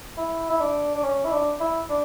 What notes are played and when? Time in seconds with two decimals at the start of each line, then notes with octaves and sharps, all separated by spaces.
0.17 E4
0.50 E4
0.60 D4
0.95 D4
1.03 C#4
1.25 E4
1.32 D4
1.60 E4
1.89 D4